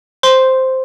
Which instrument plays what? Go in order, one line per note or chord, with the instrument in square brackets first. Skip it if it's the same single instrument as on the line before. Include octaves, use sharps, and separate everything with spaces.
[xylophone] C5 C6